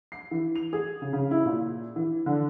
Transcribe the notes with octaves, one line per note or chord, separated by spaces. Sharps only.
C7
E3
F7
G#4
C#3
C#3
E4
A#2
E3
D3